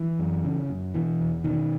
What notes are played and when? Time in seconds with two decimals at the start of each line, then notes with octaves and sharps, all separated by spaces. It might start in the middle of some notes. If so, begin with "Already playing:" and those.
Already playing: E3
0.19 F#2
0.45 C#3
0.69 F#2
0.95 B2 E3
1.20 E2
1.44 B2 D#3